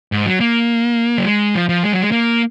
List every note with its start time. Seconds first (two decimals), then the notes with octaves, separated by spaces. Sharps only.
0.12 G#2
0.26 F#3
0.40 A#3
1.18 F#3
1.26 G#3
1.55 F3
1.69 F3
1.83 G#3
1.92 F#3
2.02 G#3
2.12 A#3